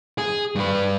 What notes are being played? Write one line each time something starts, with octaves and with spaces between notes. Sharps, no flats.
G#4
G2 B4